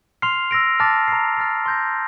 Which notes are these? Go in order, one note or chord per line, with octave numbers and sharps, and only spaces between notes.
C6 F6 C7 F7
E6 A#6 D7
A5 D6 F6 A6
A#5 F6 C7
F6 A6 C7
C6 G6 A#6